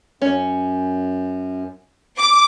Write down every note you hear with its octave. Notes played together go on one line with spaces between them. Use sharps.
F#2 C#4
D6